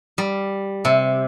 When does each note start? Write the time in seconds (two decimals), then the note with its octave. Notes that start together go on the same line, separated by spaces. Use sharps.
0.18 G3
0.85 C3